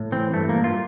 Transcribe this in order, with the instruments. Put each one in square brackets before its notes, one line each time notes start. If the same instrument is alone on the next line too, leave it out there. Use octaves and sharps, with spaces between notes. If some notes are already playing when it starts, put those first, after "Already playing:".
Already playing: [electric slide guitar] A2
E3 C4
G2 A3
A#3
G2
F4